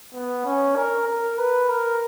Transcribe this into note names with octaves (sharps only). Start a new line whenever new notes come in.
B3
C#4
A#4
A#4
B4
A#4